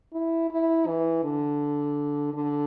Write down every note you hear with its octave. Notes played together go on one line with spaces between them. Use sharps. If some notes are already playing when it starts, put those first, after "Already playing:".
E4
E4
E3
D3
D3